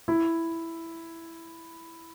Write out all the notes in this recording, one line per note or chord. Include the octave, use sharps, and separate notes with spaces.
E4